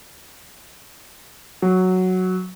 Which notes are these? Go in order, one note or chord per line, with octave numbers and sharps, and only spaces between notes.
F#3